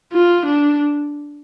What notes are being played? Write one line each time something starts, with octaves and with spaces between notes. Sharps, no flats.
F4
D4